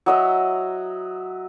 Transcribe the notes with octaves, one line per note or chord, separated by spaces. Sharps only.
F#3 D#5 E5